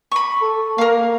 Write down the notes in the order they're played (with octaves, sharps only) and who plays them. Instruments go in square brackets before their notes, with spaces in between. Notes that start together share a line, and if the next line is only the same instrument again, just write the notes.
[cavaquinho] B5 C#6
[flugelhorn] A4
[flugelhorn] A#3 [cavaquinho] A#4 F5